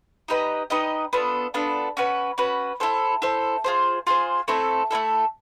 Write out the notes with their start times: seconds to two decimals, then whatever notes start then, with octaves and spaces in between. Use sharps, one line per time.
0.28 D#4 G4 B4 D#5
0.70 D#4 G4 B4 D#5
1.13 B3 D4 F4 A4
1.54 B3 D4 F4 A4
1.97 C#4 F#4 B4
2.38 C#4 F#4 B4
2.80 E4 A4 C5
3.22 E4 A4 C5
3.64 F4 G#4 C5
4.07 F4 G#4 C5
4.48 A3 C4 E4 A4
4.91 A3 C4 E4 A4